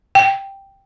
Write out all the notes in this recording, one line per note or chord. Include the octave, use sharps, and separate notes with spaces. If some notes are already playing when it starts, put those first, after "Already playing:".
G5